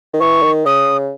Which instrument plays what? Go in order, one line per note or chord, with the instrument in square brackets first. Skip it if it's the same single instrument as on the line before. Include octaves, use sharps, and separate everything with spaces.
[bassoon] D#3
[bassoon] E3 [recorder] C#6
[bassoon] D#3
[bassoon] C#3 [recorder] D#6